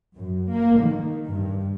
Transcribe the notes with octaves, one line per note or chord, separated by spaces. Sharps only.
F#2
A#3
D#3
G2